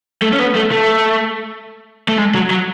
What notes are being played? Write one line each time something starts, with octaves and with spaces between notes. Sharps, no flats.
A3
C#4
B3
A3
A3
A3
G#3
F#3
F#3